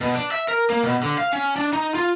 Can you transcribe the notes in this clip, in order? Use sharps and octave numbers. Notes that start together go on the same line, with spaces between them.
B2
D4
E5
A#4
A#3
B2
D3
F5
C#4
D4
D#4
F4